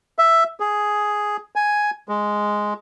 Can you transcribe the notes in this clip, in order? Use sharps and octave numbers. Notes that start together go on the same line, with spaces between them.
E5
G#4
G#5
G#3